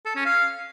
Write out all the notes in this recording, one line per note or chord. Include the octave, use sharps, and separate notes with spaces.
A4
C#4
F5